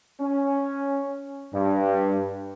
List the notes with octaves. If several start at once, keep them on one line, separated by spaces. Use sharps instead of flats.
C#4
G2